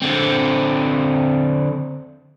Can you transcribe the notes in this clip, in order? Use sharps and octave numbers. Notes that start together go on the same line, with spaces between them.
D3 C4